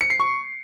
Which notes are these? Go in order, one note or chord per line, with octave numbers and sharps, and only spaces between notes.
C#7
C7
C#6